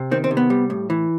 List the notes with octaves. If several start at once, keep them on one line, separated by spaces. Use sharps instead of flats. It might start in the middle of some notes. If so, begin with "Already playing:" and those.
Already playing: C3
D#3 C4
C4
C3
B3
G3
A2
E3